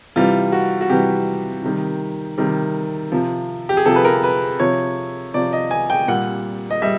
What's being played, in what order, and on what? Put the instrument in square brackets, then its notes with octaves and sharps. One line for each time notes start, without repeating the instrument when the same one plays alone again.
[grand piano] C3 E3 G3 F4
F#4
F#4
C3 E3 G3 G4
C3 D#3 G3
C3 D#3 G3
C3 F3
G4
G#4
C3 F3 A4
B4
A#4
B4
C3 F3 C#5
C3 F3 D5
D#5
G#5
G5
A#2 G3 F#5
D#5
G3 E5